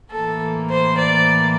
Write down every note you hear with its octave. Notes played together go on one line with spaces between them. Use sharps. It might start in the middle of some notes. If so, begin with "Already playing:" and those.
A2 E3 A#3 A4
C5
D5